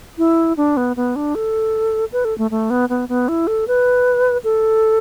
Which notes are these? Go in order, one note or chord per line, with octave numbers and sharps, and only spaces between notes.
E4
D4
B3
B3
D4
A4
B4
A4
A3
A3
B3
B3
B3
E4
A4
B4
A4